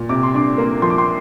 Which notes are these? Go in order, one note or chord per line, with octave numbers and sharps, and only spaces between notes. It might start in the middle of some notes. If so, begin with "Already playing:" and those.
Already playing: A#2
C3 D6
C6
D4 D6
A#3
F3 C6
D6
C6